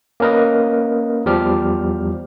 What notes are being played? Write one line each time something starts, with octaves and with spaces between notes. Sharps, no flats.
A#3 C#4 A#4 B4 D#5
E2 F3 G3 G4 F6